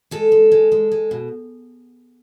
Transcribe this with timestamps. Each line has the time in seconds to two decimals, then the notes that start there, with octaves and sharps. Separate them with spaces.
0.11 G#3 A4
0.32 G#3
0.52 G#3
0.72 G#3
0.92 G#3
1.11 B2